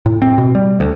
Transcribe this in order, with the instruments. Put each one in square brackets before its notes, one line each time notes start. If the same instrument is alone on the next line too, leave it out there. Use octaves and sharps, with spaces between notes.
[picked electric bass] A2
C4
B2
G3
D2